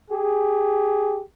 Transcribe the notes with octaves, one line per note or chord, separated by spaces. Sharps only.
G4 G#4